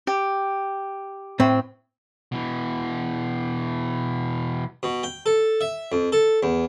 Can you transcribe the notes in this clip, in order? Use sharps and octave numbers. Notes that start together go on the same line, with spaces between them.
G4
A2 C4
B2 E3
B2
G5
A4
E5
F2
A4
E2